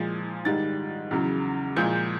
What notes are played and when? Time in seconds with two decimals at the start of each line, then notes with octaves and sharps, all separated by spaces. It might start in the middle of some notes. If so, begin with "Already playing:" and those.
Already playing: A#2 F3 G#3
0.45 G#2 D#3 G3 A6
1.11 E2 C#3 F#3
1.76 A#2 F3 G#3 G6